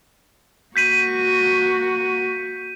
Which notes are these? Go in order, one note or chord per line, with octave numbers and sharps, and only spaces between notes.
A#3 F#4 G6 B6 D#7